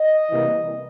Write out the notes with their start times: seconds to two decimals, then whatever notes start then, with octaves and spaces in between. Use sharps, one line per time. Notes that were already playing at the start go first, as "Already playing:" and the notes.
Already playing: D#5
0.29 C3 E3 G3 A#3